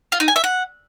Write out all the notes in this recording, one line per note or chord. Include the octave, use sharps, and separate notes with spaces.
F4
D#4
G#5
E5
F#5